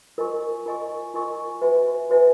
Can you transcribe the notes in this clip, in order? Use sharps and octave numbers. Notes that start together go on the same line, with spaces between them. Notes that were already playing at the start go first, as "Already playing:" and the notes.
F4 A#4 D#5 G#5 C#6
F4 A#4 D#5 G#5 C#6
F4 A#4 D#5 G#5 C#6
F#4 B4 E5 G#5
F#4 B4 E5 G#5